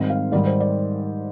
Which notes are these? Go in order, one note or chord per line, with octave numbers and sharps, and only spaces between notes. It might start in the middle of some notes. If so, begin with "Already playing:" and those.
Already playing: G#2 D#3 G3 C4
F5
G#2 D#3 G3 D5
C5
D5